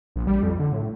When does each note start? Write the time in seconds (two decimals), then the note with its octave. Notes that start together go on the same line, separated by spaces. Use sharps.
0.16 A#1
0.27 G3
0.43 F2
0.59 D3
0.72 A2